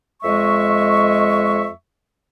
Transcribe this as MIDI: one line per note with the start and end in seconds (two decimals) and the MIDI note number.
0.23 1.69 41
0.23 1.69 56
0.23 1.69 75
0.23 1.69 76
0.23 1.69 85